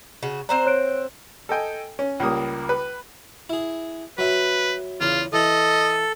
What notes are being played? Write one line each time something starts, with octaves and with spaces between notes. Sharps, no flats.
C#3 F#4
C4 C5 D5 F#5 A#5
C#5 F#6 D7
A4 D#5 G5 G#5
C#4
C#2 G3 A#3 D#6
B4
E4 G#4
F#3 B4 E5 B5
E2 C#3 F4 A#4
E3 A4 D#5